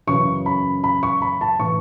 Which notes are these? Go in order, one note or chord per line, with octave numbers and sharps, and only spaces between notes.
F#2 C#3 E3 C#6
B5
B5
C#6
B5
A5
A2 E3 C#6